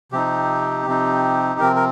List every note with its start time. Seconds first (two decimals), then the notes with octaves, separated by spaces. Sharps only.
0.12 C3 F3 C4 D#4 G4
0.87 C3 F3 C4 D#4
1.60 C3 F3 C4 A#4
1.76 A#4